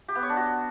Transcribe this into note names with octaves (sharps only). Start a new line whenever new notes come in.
G4
B3
C#5
D4
F#4